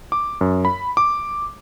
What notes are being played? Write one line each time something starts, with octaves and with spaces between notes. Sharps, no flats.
D6
F#2
B5
D6